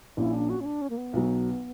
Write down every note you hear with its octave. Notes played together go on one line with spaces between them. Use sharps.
A#1 A#2 A#3 C#4 E4
D4
F#4
C#4
D4
C#4
A#3
B3
B1 B2 F#3